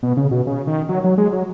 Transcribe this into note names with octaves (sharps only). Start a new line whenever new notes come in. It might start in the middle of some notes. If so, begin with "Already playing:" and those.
B2
C#3
B2
C#3
D#3
F#3
F#3
G#3
F#3